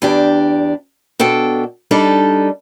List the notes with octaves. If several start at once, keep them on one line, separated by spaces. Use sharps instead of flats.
E2 D4 G4
B2 D4 A4 G5
G3 D4 D#4 A4